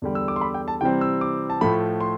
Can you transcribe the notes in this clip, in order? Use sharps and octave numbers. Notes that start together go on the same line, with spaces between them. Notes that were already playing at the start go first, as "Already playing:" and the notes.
E2 D3 G3
E6
D6
C6
B5
G5
A5
C3 E3 G3 C4 G5
E6
D6
A5
A2 F3 A3 B5
C6